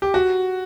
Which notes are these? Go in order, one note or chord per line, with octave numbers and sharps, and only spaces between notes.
G4
F#4